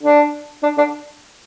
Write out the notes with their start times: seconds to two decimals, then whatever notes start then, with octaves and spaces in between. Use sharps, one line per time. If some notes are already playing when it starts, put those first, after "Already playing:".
0.03 D4
0.63 D4
0.78 D4